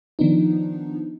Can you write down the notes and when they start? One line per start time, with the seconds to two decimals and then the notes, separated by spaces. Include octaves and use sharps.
0.19 D#3 F3 B3 D4 D#4